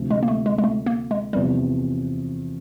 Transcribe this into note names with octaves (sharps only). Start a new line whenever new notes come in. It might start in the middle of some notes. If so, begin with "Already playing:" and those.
Already playing: D2 C3 F3
G#3
A#3
A3
G#3
G#3
A3
A#3
G#3
E2 C3 F3 G3